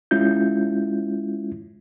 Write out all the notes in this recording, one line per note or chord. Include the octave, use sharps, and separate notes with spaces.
G#3 C#4 E4 F4 G6